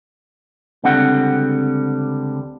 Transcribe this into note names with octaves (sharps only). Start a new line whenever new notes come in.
C#2 D3 G3 C4 F#5